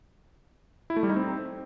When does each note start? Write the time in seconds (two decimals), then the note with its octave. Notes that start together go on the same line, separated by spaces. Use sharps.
0.90 E4
0.96 A3
1.03 G3
1.10 D#4
1.16 C4